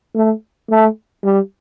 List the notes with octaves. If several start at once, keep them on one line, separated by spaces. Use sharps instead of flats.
A3
A3
G3